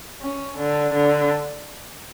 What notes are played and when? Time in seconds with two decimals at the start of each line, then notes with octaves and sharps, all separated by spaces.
0.21 C#4
0.58 D3
0.94 D3